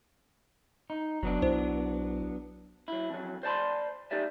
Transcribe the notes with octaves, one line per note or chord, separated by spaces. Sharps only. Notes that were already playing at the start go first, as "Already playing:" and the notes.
D#4
F#1 F#3 B3 D4
B1 E4 C5
F#3 E4
F2 F#3
C5 D5 A5 B5 C6
D#4 G4 D5 E5